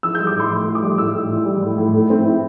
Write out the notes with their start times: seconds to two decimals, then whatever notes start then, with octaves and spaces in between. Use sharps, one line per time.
0.03 E3 E6
0.15 G6
0.20 G3
0.27 D6
0.35 A2
0.40 C6
0.51 A2 C6
0.67 E3
0.75 D6
0.82 G3
0.98 A2 E6
1.15 A2
1.30 E3
1.46 G3
1.63 A2
1.78 A2
1.94 A3
2.10 C4
2.25 E4